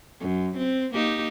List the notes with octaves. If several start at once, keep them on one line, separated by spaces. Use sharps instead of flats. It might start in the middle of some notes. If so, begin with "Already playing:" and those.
F#2
C4
A#3 D#4 G4